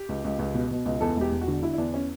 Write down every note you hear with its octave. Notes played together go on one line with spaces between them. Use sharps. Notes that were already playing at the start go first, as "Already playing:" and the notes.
Already playing: G4
C#2
C#2
C#2
B2
B2
C#2
E2 A4
E1 G4
E1
F#4
D3
D3 E4
E4
E2 D4
C#4